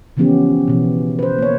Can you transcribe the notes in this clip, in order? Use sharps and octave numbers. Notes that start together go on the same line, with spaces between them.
C#3 E3 F3 B3 C#4 G4
B2 E3
B4 C5
A#3 C#5